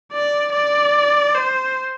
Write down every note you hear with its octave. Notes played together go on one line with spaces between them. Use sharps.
D5
D5
C5